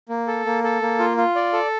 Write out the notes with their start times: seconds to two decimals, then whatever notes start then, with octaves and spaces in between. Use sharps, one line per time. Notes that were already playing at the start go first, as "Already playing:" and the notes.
0.09 A#3
0.27 A4
0.46 A#3
0.63 A4
0.82 A#3
0.99 F4
1.17 F4
1.35 D5
1.53 A4